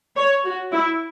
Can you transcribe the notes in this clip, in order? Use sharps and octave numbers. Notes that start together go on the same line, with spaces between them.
C#5
F#4
E4